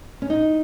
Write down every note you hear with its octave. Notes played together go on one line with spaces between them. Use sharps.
C#4
D#4